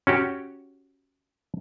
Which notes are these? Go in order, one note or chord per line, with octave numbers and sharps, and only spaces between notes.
C#4 F#4 G4